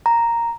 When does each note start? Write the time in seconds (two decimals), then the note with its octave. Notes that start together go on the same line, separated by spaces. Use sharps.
0.06 A#5